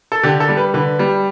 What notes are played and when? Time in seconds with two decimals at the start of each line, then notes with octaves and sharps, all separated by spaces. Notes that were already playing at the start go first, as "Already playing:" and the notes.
0.12 A4
0.23 D3 G4
0.40 A4
0.49 G3
0.57 B4
0.74 D3 B4
0.99 G3